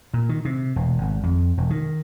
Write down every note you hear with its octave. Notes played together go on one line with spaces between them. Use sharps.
A#2
D#3
C3
E1
G#1
F2
E1
D#3